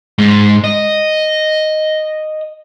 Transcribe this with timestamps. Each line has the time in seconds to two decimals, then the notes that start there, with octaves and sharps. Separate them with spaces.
0.18 G#2
0.64 D#5